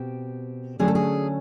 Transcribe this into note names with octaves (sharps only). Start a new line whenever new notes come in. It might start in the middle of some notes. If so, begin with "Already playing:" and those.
Already playing: B2 C4 G4
D3 F#3 A3 C#4 G#4
A4
G#4